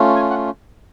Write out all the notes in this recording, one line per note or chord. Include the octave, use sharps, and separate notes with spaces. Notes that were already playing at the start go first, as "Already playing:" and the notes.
Already playing: A3 C#4 F4
G#5
F#5